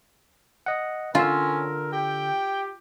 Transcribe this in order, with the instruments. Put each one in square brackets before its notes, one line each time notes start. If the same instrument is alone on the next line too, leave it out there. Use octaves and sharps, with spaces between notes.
[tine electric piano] D#5 F#5
[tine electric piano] D3 E6 [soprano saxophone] C#4 [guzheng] F4 [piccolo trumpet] A#4
[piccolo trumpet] G4 [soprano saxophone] G5